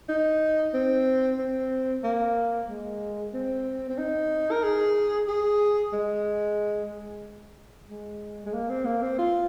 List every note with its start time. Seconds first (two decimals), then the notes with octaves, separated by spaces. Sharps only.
0.09 D#4
0.74 C4
1.39 C4
2.04 A#3
2.68 G#3
3.34 C4
3.89 C4
3.98 D#4
4.51 A#4
4.63 G#4
5.28 G#4
5.93 G#3
7.89 G#3
8.46 G#3
8.53 A#3
8.69 C4
8.85 A#3
9.02 C4
9.18 F4